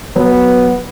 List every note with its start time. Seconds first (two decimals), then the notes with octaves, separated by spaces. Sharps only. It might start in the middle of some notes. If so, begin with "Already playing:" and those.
0.16 F#3 B3